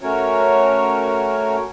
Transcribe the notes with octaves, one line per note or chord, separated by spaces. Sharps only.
A3 C#4 F#4 A#4 C#5